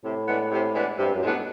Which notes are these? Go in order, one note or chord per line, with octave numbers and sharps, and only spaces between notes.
A2 C3
E3 G#3 B3 D4
C3
E3 G#3 B3 D4
G2 C3
F#2
A2 E3 G#3 B3 D4